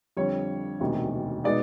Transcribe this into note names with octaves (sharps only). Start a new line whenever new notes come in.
F2 D3 G3 C#5
E1 D2 C3 D#3
B2 G#3 B3 D#4 D5